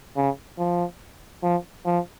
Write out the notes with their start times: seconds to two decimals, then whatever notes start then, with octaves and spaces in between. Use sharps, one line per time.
0.16 C#3
0.58 F3
1.43 F3
1.86 F3